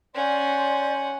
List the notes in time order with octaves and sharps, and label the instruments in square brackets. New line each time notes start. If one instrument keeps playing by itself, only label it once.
[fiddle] C#4 F#5 [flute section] D5 C6 G6